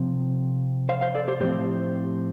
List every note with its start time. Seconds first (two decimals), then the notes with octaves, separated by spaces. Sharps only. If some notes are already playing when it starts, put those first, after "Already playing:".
Already playing: C3 F3 C4
0.89 C5 F5
1.01 C5 F5
1.15 A4 D5
1.28 G4 C5
1.40 A2 F3 C4 G4 C5